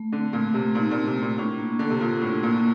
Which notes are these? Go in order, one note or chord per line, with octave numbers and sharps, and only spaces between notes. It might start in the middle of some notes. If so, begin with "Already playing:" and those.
Already playing: A3
D3 C4
A#2 A3
C3 A3
A#2 D#4
A#2 C4
C3
A3
A#2
A2 D4
A#3
D3 A4
C3
A#2 F4
A2 D4
A#2 A#3